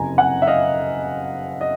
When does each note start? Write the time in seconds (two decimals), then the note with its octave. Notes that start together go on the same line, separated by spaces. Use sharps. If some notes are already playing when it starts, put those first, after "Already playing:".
Already playing: F#1 F2 C3 G#5 A#5
0.18 F#5 G#5
0.42 E5
0.47 D#5 F5
1.61 D#5